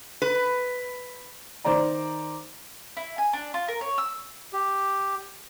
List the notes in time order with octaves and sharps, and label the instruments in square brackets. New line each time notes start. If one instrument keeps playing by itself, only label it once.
[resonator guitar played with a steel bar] B4
[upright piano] D#3 C5 D5 A#5
[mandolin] E4
G#5
D4
F4
A#4
C#5
E6
[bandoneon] G4